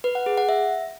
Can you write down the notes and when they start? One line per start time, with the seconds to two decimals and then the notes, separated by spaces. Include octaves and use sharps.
0.04 B4
0.15 F#5
0.26 G#4
0.38 F#5
0.49 E5